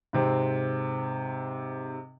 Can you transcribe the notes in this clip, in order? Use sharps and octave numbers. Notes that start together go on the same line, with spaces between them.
G#2 C3 C4